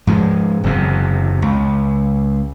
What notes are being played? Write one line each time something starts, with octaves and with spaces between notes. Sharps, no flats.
G#2 F3 G#3
F#1 E2 C3
C#2